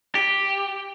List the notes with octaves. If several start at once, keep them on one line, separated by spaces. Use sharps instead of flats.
G4